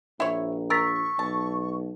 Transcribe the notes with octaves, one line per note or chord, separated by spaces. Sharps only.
A#1 E4 C#5
A#4 C#6 E6 A6 B6
B1 A5